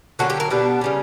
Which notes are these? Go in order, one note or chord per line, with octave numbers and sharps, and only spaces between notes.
D3 F#3 A#3 C#4 F#4
G4
A#4
B2 G3 B3 D4
C#3 G3 C#4